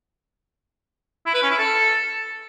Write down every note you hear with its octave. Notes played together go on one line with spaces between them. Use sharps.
E4
B4
C#4
E4
A4